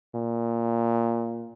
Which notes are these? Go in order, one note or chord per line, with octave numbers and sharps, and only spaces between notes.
A#2